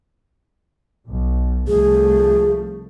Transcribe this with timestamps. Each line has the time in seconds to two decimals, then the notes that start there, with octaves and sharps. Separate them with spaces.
1.07 B1
1.68 C2 F3 A3 G#4